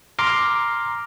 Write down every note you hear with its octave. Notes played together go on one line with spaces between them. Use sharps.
A#5 C6 D6 F6